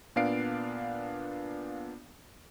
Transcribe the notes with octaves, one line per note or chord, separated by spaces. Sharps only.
A#2 B3 D4 F5 C7 D7